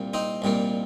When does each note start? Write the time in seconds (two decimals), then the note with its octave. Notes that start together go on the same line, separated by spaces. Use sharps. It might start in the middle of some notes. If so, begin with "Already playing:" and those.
Already playing: C2 A#2 G3 A#3
0.14 C4 D#4
0.42 C2 A#2 G3 A#3